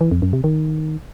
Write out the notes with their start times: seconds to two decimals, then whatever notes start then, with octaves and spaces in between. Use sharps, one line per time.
0.01 E3
0.11 F2
0.22 F#2
0.33 C3
0.44 D#3